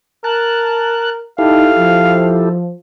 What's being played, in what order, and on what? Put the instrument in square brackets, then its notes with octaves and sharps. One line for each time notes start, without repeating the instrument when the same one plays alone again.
[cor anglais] A#4 [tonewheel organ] A5 F#6
[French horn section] D#4 [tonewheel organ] E4 G4 A4 [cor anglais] F5
[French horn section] F3